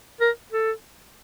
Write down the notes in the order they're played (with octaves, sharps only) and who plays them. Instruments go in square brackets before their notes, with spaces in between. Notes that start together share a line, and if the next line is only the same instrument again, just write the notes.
[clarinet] A#4
A4